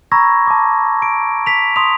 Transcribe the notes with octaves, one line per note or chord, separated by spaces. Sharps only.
A#5 B5 C#6 E6 G#6 A#6
A5 D6
D7
B6 F7
C6 D#6 B6 F7